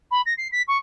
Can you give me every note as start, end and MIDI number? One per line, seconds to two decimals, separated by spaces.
0.11 0.21 83
0.26 0.34 94
0.38 0.48 96
0.52 0.62 95
0.68 0.77 85